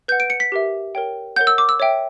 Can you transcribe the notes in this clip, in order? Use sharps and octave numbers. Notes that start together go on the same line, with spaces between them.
B4 F#5 G6
D7
C#7
B6
G4 A#4 E5
A#4 C#5 G5
A#4 C#5 F#5 G6
E6
D6
E6
C#5 E5 G5